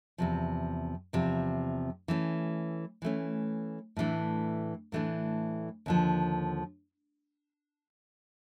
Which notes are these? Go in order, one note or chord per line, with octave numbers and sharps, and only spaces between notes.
E2 C3 F3
E2 C3 F3
E3 A3 C#4
E3 A3 C#4
A2 E3 A3 D4
A2 E3 A3 D4
D#2 D3 F3